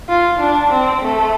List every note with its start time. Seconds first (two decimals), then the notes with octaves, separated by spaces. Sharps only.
0.09 F4
0.39 D4
0.71 C4
1.02 A3